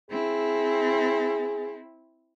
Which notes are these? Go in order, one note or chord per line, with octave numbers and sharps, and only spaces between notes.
C4 E4 G#4